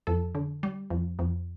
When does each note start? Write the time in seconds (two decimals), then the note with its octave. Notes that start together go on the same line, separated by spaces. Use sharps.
0.07 F2 A4
0.35 D3
0.63 G3
0.90 F2
1.19 F2